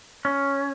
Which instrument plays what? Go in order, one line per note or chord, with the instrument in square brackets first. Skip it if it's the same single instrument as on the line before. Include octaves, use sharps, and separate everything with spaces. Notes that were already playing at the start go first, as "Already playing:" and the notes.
[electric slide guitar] C#4